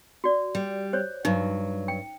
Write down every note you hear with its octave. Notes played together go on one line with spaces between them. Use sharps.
F#4 D5
G3
C5 C#5
G2 F#3 D#4
G5